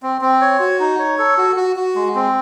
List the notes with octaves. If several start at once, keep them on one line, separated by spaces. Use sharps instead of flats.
C4
C4
C#5
F#4
D#4
C#5
A4
F#4
F#4
F#4
G#3
C4